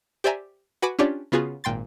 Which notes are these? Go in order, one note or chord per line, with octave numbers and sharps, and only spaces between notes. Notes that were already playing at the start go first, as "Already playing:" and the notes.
G4 C5 D5 E5 G#5 A#5
F#4 B4 G#5 B5 D6
C#4 D4 F4 G4 C#5 D5
C#3 B3 F4 F#4 G#4
G#1 A#2 G5 C6 A6